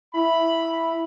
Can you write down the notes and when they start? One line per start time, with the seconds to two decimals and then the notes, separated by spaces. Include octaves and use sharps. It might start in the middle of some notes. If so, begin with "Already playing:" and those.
0.14 E4 B5